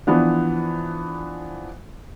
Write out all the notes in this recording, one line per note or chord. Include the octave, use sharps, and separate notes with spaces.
E3 F3 B3 D4